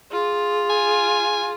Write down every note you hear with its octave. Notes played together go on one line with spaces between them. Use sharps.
F4 G#4
G#5